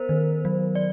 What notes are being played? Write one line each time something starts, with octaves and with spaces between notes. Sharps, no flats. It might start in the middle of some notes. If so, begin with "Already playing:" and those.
Already playing: B3 A#4 C5
D#3
F#3
D5